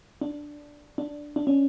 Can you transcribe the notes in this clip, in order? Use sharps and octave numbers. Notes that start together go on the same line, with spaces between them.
D4
D4
D4
C#4